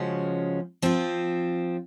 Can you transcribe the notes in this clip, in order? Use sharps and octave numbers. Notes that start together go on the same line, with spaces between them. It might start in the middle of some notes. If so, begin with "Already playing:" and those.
Already playing: C#3 F3 G#3 C#4 F#4
F3 C4 F4